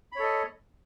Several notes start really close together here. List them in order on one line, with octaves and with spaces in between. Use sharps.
B5 C#5 A4 D#5